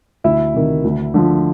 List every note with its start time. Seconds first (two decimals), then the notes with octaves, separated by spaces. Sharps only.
0.24 D2 E4 E5
0.54 C3 D#3
0.84 D2
1.14 D3 F3